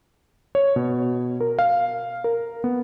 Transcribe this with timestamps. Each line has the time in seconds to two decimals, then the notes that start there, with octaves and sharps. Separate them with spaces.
0.55 C#5
0.76 B2
1.41 A#4
1.59 F5
2.24 A#4
2.64 B3